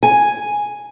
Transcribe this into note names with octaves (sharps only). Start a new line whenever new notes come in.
G#5